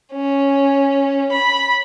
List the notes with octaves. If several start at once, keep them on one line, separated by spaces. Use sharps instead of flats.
C#4
B5